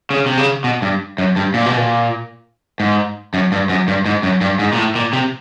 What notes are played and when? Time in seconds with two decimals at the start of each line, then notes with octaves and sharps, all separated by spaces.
0.10 C#3
0.26 C3
0.37 C#3
0.64 B2
0.82 G2
1.18 F#2
1.36 G2
1.54 A#2
1.66 B2
1.77 A#2
2.80 G#2
3.34 F#2
3.52 G2
3.69 F#2
3.88 G2
4.06 G#2
4.23 F#2
4.41 G2
4.59 G#2
4.73 A#2
4.78 A2
4.95 A#2
5.13 C3